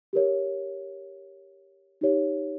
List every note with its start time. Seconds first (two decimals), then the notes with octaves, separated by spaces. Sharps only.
0.13 G4 A#4 C#5
2.01 D#4 G4 C#5